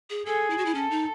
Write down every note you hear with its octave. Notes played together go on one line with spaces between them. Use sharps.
G#4
G#4 A4
E4
F#4
E4
C#4 A4
D#4